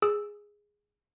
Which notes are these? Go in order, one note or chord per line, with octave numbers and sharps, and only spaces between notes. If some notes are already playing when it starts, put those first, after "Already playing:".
G#4 E6